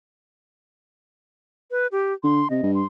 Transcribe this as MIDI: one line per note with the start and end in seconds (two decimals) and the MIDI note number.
1.71 1.87 71
1.92 2.13 67
2.24 2.43 50
2.24 2.48 84
2.50 2.59 48
2.50 2.71 75
2.63 2.83 43
2.75 2.86 84